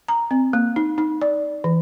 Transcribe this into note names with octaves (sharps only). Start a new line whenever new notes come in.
A#5
C4
A#3
D#4
D#4
D5
E3